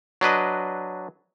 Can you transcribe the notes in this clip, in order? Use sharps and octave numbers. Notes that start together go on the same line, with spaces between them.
F#3 D4 B4 D#5